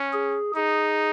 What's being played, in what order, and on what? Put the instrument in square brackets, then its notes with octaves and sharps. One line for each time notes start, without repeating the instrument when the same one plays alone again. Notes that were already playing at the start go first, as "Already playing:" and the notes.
Already playing: [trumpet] C#4
[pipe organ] G#4
[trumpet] D#4 [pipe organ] G#4